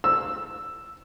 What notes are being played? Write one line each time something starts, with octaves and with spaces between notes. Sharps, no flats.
E6